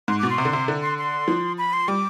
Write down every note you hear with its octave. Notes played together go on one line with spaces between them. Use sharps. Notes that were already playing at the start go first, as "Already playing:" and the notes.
G#2 C6
B2 D6
C6
C3
D3
C3
D3
C6
C6
F3
B5
C6
G3 D6